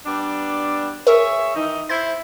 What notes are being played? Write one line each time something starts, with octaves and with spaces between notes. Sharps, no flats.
G3 B3 D4
G#4 A#4 C#5 E5
D#3 E3 D#4
E4 C5 G#6